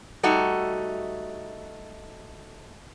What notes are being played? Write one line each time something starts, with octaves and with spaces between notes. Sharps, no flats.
G3 A3 D#4 F#4 E5